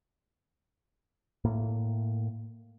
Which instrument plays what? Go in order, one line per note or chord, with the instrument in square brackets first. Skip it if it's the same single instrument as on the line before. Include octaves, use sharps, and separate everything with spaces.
[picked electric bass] A2 A#3